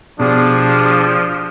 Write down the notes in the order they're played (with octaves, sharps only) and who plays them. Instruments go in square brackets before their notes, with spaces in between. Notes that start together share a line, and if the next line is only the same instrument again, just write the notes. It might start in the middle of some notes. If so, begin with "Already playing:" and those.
[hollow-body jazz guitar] B2 [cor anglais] F3 [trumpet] D4 [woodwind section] G4 G#4